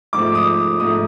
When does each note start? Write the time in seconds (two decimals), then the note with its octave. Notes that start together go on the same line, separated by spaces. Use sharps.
0.13 G#2 F3 A3 D6
0.35 D#6
0.80 G#2 F3 A3 D#6